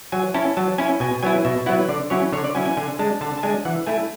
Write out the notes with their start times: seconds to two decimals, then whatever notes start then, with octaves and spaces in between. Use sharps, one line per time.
0.12 F#3 G#5
0.34 C#4 E4 A5
0.57 F#3 A5
0.78 C#4 E4 G#5
1.00 B2 G#5
1.23 F#3 B3 E4 G#5
1.45 B2 E5
1.66 F#3 B3 E4 F#5
1.89 D3 D5
2.10 F#3 C#4 E4 C#5
2.32 D3 C#5
2.44 D5
2.55 F#3 C#4 E4 G#5
2.66 G#5
2.77 D3 G#5
2.99 G#3 D4 A5
3.21 D3 A5
3.38 A5
3.43 G#3 D4 G#5
3.65 E3 F#5
3.87 A3 E4 G#5